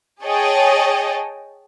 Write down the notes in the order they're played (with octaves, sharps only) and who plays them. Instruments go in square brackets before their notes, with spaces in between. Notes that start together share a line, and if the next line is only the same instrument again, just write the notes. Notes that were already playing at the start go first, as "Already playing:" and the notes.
[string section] G#4 C#5 D#5 G5 A5